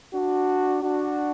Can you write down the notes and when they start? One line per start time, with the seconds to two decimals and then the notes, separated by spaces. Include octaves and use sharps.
0.14 D4 F#4
0.82 D4 F#4